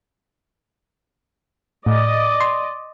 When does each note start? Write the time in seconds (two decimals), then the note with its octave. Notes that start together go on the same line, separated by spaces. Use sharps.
1.86 A2 D5 D#5
2.41 C6